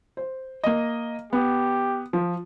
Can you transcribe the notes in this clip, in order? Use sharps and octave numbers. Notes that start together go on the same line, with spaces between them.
C5
A#3 D#5
B3 G4
F3